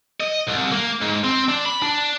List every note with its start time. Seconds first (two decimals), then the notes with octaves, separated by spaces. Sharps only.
0.21 D#5
0.48 C2
0.72 A#3
1.01 G#2
1.24 C4
1.48 D4
1.65 B5
1.82 D4